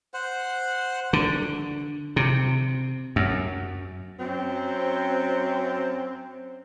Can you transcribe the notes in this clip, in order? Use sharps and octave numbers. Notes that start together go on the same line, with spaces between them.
C5 F#5
D3
C3
F#2
F#2 F#3 C4